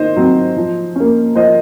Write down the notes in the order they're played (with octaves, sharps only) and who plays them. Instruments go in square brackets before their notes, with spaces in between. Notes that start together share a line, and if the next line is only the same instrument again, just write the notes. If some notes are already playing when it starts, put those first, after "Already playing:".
Already playing: [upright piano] D#3 C5 D#5
F#3 C4
F3
A#3 C#4
F3 C5 D#5